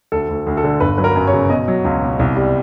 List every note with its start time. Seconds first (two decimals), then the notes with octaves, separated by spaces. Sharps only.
0.12 D2 A4
0.29 D2
0.47 D2
0.57 A4
0.64 D3
0.80 G1 B4
0.98 F#3 B4
1.04 A#4
1.16 F#2
1.27 C#5
1.33 C#3
1.50 B2 D#5
1.68 F#3
1.85 C#2
2.02 B2
2.19 C2
2.36 G3